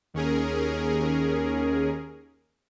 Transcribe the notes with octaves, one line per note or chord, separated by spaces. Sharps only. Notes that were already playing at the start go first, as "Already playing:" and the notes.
D#2 C#4 G#4 A#4